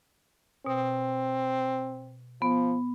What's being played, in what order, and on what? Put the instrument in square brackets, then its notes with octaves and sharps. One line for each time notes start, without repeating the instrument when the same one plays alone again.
[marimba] B2 [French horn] C4
[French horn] F3 [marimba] B3